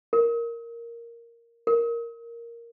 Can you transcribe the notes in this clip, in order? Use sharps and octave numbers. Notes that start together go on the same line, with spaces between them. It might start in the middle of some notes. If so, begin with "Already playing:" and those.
A#4
A#4